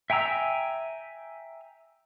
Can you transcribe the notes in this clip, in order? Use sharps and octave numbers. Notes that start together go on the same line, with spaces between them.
E5 G5 G#5 A#5 E6